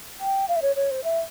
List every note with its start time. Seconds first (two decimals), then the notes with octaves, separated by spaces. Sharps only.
0.20 G5
0.48 F5
0.56 E5
0.62 C#5
0.76 C#5
0.91 C5
1.04 E5